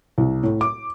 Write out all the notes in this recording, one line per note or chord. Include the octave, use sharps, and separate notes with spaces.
C2
A2
D6